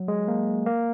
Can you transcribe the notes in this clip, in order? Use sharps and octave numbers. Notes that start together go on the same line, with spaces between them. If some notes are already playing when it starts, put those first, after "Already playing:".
Already playing: F#3
G#3
A#3
A#3